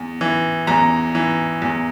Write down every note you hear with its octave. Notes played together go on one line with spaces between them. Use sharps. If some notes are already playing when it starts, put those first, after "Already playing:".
Already playing: E2
E3
E2 A#5
E3
E2